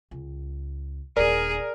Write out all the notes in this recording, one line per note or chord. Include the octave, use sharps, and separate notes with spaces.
C#2
D#1 D4 G#4 A#4 D5 A#5